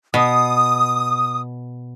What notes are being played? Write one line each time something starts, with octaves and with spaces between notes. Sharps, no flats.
B2 D#6